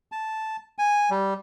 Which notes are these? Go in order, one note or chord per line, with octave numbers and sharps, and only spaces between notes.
A5
G#5
G3